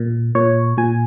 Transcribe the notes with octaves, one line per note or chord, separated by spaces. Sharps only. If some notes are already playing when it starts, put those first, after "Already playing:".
Already playing: A#2
A#2 C#5
A#2 G#5